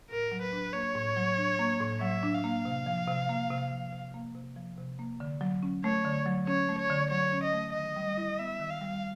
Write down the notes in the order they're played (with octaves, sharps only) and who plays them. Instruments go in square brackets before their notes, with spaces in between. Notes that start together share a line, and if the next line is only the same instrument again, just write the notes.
[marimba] A2 [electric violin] A#4
[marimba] F#3
[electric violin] B4
[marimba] D4
[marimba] A#3 [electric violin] C#5
[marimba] A2
F#3
D4
A#3
A2
[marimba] F#3 [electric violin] E5
[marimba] D4
[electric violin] F5
[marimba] A#3
C3
F3
C3
A#3
C3
F3
C3
A#3
C3
F3
C3
A#3
D3
F#3
C#4
[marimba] A3 [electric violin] C#5
[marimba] D3
F#3
[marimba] C#4 [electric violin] C#5
[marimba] A3
[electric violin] C#5
[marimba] D3
[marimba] F#3 [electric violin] C#5
[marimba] C#4
[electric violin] D#5
[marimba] A3
[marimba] D#3 [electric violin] D#5
[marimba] G3
E4
[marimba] B3 [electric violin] E5
[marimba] D#3
[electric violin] F5
[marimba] G3